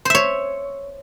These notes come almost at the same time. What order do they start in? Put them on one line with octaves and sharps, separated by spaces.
C5 E5 C#5